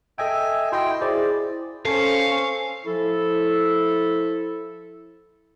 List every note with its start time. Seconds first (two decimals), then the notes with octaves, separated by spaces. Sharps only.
0.18 A4 D#5 E5 G5 G#5
0.72 E4 F#4 D#5 G5 C6
1.01 E4 G#4 C5 D5
1.85 C#4 A4 C5 F5
2.85 F3 E4 A4